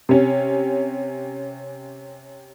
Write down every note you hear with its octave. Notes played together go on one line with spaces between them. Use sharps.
C3 C#4